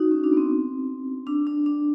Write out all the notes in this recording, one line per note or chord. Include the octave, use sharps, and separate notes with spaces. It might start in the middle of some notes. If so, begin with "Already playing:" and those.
Already playing: D#4 F#4
C#4
D4
B3
C4
D4
D4
D4